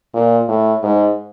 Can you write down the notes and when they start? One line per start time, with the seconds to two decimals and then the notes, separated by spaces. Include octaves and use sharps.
0.14 A#2
0.49 A2
0.83 G#2